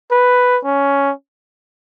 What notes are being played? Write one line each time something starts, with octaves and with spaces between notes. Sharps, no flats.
B4
C#4